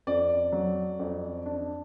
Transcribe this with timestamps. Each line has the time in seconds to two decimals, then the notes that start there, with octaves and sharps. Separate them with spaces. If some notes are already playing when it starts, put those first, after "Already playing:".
0.07 F2 D5
0.52 F#3
0.99 F2
1.46 D4